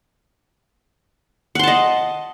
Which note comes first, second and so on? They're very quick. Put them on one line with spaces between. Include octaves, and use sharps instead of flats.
F#5 C6 A5 D#5